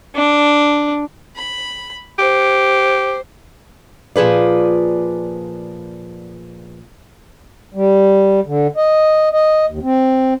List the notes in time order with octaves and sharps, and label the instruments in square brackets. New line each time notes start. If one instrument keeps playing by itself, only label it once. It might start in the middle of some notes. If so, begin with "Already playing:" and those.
[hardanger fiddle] D4
[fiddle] B5
[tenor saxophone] G4 [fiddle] C5
[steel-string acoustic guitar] A#2 F3 G#4 B4 D5
[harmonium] G3
D3
D#5
D#5
D#2
C4